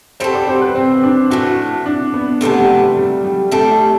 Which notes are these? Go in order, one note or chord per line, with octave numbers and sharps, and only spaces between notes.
G3 C4 F#4 A4 C5
D5
C5
B4
C4
C4
D4
A2 E3 A3 F#4
D4
B3
C3 E3 A3 B3 D4
G3
G3
G3
G3
G3 A3 D4 A4
E4